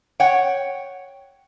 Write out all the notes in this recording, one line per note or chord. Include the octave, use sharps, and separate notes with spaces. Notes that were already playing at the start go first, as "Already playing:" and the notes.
C#5 F#5 G5